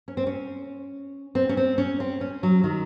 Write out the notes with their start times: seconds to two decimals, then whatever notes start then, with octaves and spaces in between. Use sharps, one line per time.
0.08 C#4
0.17 C4
0.27 C#4
1.35 C4
1.49 C#4
1.57 C4
1.78 C#4
2.00 C4
2.21 C#4
2.43 F#3
2.64 D#3